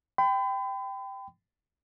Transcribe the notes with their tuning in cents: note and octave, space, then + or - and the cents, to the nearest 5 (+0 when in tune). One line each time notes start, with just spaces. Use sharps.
G5 +0 B5 +40